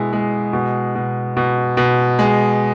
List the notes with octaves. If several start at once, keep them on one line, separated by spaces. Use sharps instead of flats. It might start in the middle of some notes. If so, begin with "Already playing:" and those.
Already playing: B2 G#3 E4
G#3
B2
B2
B2
B2
G#3